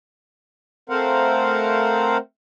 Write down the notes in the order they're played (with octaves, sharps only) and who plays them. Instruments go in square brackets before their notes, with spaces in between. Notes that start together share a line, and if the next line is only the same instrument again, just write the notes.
[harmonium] A3 C4 A#4 C5 F5 F#5